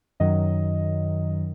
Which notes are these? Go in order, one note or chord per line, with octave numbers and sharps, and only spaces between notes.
F#2 D#3 F#3 D#5